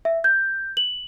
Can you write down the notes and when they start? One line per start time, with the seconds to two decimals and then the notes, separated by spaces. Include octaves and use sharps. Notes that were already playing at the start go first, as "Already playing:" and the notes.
0.05 E5
0.24 G6
0.77 F#7